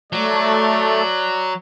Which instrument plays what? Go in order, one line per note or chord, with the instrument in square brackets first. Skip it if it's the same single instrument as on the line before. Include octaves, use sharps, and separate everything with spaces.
[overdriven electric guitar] F#3 [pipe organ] A3 [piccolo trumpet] D5